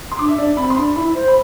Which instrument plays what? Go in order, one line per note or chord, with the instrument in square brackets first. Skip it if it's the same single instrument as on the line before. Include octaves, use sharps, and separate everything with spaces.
[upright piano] C6
[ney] D4 [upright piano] D6
[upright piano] E5
[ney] D4 [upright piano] D5
[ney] C4 [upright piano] B5
[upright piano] C6
[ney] D4 [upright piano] B5
[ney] E4 [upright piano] B5
[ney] C5
[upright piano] B5